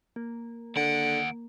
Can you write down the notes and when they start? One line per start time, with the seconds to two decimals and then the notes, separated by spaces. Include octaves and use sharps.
0.16 A#3
0.76 D#2 D3 F#5 D7